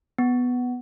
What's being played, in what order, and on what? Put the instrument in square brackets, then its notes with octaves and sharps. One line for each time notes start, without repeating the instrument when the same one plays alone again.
[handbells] B3